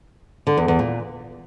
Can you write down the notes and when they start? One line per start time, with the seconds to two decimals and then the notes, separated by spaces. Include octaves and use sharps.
0.47 D3
0.57 E2
0.68 E2
0.79 A#2